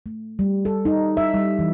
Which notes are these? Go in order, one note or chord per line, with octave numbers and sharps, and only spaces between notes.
A3
G3
A4
D#4
E5
G3
E3